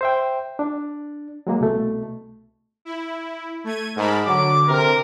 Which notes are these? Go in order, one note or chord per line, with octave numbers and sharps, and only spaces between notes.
C5 E5 G5
D4
F#3 G#3 A#3
C2 B2 A3
E4
A3 G#6 D#7
G#2 A#4 A5 B5
D3 F#3 D6
C3 A#4